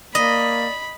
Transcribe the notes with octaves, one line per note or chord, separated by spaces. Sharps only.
A#3 D5 D#5 B5